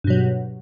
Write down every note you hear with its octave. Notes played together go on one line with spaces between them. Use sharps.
G2 B2 F#3